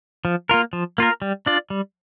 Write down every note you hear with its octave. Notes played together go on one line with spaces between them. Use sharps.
F3
A#3 F4 A#4
F3
A#3 F4 A#4
G3
D4 F4 D5
G3